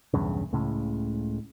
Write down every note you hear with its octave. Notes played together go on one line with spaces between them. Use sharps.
B1 E2 G2 C#3
C#2 A2 C#3